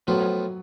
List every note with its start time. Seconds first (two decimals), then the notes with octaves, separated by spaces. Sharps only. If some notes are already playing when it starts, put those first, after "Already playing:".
0.07 A2 F3 F#3 B3 F4